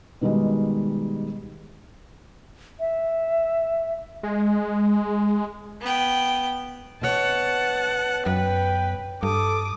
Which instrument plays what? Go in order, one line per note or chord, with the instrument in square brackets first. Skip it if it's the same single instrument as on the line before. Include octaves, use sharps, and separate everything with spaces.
[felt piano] B2 D#3 G3 G#3
[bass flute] E5
[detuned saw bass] G#3
[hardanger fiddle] B3 G5
[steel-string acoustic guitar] B2 B3 C#5 [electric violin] F#5 A5
[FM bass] F#2 [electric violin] B4 [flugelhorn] G5
[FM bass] G2 [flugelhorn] A4 [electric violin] D6 D#6